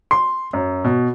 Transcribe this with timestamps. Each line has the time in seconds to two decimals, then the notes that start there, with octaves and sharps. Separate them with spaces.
0.11 C6
0.53 F#2
0.84 B2